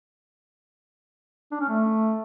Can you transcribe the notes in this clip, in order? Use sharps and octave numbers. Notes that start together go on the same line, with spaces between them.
D4
C#4
A3